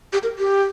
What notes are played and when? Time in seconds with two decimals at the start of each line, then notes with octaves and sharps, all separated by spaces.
0.13 G4
0.23 A#4
0.39 G4